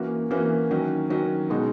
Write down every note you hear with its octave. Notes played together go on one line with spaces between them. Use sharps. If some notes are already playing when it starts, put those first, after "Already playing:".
Already playing: E3 A#3 C#4 F#4
E3 A#3 C#4 F#4
D#3 F#3 C#4
D#3 F#3 C#4
B2 G#3 D#4 F#4